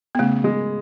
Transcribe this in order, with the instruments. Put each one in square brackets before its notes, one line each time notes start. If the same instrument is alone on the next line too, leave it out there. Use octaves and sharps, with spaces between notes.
[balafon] B3
[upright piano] C#3 [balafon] A3
[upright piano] G#3